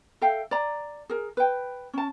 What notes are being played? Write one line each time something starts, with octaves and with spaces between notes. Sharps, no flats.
A4 E5 F5 G5
D5 A#5
G#4 A#4
B4 G5
C#4 A5